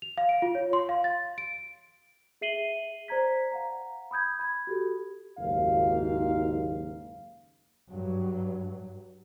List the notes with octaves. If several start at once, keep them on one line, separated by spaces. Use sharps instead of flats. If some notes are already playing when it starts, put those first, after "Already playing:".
F7
F5
D7
F4
C#5
C6
F5
A6
D7
G#4 E5 C7 D#7 F#7 G7
C5 D5 A#5 G#6 B6
F5 F#5 A#5
B5 D#6 G6 G#6
B5 G#6
F#4 G4 A4
F#1 D#2 G#2 F5
G2 F#3